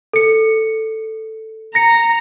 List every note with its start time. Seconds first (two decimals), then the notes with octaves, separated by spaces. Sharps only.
0.13 A4 C#7
1.75 A#5 A#6 C#7